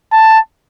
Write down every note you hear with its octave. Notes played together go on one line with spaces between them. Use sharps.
A5